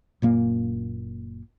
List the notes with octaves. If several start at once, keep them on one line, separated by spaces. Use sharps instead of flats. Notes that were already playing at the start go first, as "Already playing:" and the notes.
F#1 A#2 A#3